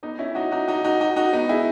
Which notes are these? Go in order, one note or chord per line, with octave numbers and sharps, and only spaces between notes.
B3 D#4
C#4 E4
D#4 F#4
D#4 F#4
D#4 F#4
D#4 F#4
D#4 F#4
D#4 F#4
B3 D#4
E4 G#4